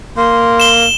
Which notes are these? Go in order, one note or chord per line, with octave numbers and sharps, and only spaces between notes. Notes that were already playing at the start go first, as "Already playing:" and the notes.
A#3 C6
E7 G7